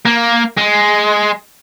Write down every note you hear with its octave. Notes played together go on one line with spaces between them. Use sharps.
A#3
G#3